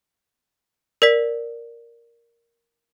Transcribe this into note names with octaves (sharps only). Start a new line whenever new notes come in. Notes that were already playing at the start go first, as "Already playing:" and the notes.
A#4 D5 B6